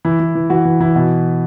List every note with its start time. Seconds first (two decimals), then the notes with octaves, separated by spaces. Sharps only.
0.05 E3 E4
0.20 E3
0.35 E3
0.50 E3 F#4
0.65 E3
0.80 E3 E4
0.95 B2